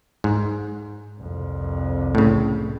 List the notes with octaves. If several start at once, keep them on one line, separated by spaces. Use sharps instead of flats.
G#2
C2 F2
A2 C#3